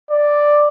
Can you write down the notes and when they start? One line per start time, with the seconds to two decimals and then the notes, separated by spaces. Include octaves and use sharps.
0.11 D5